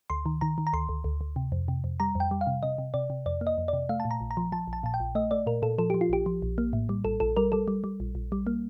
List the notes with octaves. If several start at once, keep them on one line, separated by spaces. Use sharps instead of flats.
D2 C6
D#3
D#3 A#5
D#3
A#5
D2 C6
D2
D2
D2
C3
F2
C3
F2
G3 A#5
F2 G5
G3
F5
C3
C3 D#5
C3
C3 D5
C3
F2 D5
A#3
D#5
F2
C3 D5
A3 F5
A5
A#2
A#5
A#1
A#5
F3
F3 A5
A#1
A5
A#2 A5
G5
A#1
A3 D#5
A3 D5
A#2 A#4
A#2 A4
F3 A4
F3 G4
F4
A#1 G4
F3
A#1
A#3
A2
G3
A#1 A4
A#1 A4
G3 A#4
G3 A4
G3
G3
A#1
A#1
G3
A#3